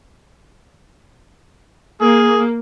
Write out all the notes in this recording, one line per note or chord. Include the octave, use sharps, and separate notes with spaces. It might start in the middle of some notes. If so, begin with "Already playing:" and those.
A#3 G#4